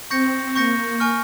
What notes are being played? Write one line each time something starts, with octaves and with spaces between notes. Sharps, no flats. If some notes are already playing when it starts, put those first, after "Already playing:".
C4 C#6 G6 A#6 C#7
A#3 C#6 G6 A#6 C#7
G#5 C#6 F6